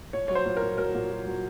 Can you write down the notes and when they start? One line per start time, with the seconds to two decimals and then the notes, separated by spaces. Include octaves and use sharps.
0.13 A#2 C#5
0.28 F#3 C#5
0.35 C5
0.46 A#2
0.57 A#4
0.62 A#2
0.78 F#3 A#4
0.95 A#2
1.11 F#3
1.27 F#3